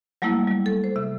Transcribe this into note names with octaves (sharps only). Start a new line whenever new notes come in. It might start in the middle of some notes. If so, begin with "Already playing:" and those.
F#3 G3 A3 A#3 E4
G3
A4
C5
C3 E5